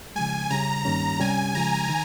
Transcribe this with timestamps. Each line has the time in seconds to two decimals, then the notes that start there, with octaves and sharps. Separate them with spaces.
0.16 C#3 F3 G#3 G#5
0.50 C#3 G3 C#4 A#5
0.85 G2 D#3 G3 A#3 C#4 A#5
1.20 C3 G3 C#4 G4 G#5
1.55 C#3 F3 G#3 A#5
1.89 D#3